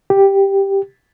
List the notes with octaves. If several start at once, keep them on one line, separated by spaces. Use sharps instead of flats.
G4